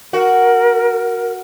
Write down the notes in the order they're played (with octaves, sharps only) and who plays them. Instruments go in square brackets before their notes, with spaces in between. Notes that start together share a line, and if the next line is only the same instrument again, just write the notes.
[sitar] F#4 [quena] A#4